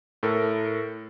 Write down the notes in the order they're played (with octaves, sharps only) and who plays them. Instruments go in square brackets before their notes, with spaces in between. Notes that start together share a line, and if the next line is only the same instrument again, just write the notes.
[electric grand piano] A2 A4 A#4